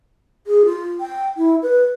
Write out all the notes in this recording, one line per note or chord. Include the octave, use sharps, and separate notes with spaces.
G#4
F4
G5
E4
B4